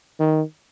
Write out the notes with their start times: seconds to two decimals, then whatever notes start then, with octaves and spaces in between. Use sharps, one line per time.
0.20 D#3